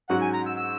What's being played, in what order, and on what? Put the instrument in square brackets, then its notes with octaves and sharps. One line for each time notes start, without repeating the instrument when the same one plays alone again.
[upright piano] G#2 F#3 C#4 F#4 [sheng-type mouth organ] F#5
[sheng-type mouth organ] G#5
A#5
E6
E6